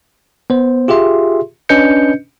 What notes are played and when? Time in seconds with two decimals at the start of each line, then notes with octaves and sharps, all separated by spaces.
0.50 B3 C5
0.88 F4 G4 G#4 E5 C6
1.69 C#4 D4 B4 D#5 G6 C#7